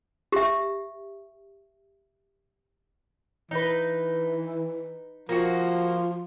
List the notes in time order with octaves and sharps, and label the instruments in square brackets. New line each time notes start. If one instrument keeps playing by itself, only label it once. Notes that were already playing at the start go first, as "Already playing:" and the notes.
[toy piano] G4 E5
[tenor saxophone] E3 [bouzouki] D#4 B4
[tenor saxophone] F3 [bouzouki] A#3 F#4